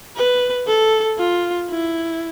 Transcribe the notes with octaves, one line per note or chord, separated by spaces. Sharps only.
B4
A4
F4
E4